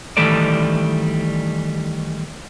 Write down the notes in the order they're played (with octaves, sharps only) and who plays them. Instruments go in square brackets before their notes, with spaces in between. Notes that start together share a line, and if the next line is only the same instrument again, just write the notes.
[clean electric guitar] D#3 E3 G3 A3 A4 D5